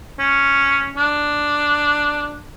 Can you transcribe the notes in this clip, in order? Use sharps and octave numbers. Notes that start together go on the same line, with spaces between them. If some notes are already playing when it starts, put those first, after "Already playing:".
C#4
D4